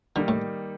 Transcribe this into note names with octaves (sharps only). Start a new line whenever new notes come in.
D3 D#3 G3 A#3 D#4
A2